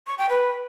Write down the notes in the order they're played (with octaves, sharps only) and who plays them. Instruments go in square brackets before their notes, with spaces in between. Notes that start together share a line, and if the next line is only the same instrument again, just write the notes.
[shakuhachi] C#6
G5
B4